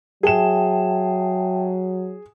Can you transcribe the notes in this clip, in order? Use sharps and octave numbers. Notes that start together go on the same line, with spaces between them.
F#3 G#4 E5 G5 A5 E7